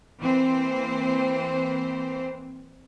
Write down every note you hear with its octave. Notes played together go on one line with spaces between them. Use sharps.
E3 A#3 C4 C5